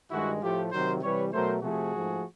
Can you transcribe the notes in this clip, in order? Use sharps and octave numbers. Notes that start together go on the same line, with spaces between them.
G2 D#3 G#3 E4 F#4
A2 F3 A3 F4 G4
C3 D#3 F#3 A#4 C5
C3 E3 G3 B4 C#5
B2 F#3 A3 A#4 C5
C3 F3 A3 F#4 G#4
G#2 F3 A3